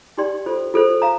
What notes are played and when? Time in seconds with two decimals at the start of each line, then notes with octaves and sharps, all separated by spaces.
0.17 D#4 G4 D5 G5 C6
0.46 F4 A4 C5
0.74 F4 A4 C5
1.02 F5 A#5